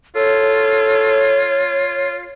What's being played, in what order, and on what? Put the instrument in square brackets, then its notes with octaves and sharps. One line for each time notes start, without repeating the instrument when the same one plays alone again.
[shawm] F4 [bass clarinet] A4 [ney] C#5